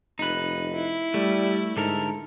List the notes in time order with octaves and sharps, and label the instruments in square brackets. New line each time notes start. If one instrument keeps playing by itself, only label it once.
[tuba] F1 [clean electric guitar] D#4 B4
[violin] E4
[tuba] G3 [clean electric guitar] A3
[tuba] G#2 [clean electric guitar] D3 A4 A#4